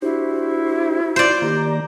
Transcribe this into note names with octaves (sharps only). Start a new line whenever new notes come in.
D4 E4 F#4 G4 C5
C5 D5
D#3 A#3 G4 A#5